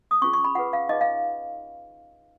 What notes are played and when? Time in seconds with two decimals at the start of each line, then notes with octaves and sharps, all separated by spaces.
0.11 D#6
0.22 C#4 F4 G#4 C#6
0.33 C#6
0.44 B5
0.55 F4 G#4 B4 F#5
0.73 F5
0.89 D#4 G#4 B4 D#5
1.01 F5